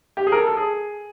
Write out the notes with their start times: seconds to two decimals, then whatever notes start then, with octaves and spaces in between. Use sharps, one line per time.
0.17 G4
0.27 G#4
0.32 A#4
0.36 A4
0.47 A4
0.57 G#4